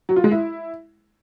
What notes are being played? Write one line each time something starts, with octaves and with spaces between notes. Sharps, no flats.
F#3
F4
G#3
E4